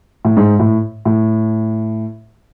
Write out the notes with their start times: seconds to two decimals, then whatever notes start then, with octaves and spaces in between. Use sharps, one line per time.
0.25 A2
0.37 G#2
0.59 A2
1.05 A2